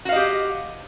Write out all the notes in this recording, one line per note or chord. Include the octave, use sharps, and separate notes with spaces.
F#4 G4 D#5 F5